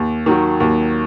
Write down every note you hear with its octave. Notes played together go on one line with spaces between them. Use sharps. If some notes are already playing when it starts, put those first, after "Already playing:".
Already playing: D#2
D#3 F#3
D#2